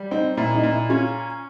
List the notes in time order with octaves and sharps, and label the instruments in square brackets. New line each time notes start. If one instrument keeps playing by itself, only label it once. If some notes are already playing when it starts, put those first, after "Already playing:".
Already playing: [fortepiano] G3
[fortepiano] C4 [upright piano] D#4
[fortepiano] A#2 [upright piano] E4
[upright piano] D#4
[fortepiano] A#2
[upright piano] E4
[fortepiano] C#4 [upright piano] F4